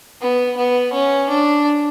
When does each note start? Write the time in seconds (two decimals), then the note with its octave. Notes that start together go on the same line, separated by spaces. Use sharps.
0.22 B3
0.57 B3
0.93 C#4
1.29 D4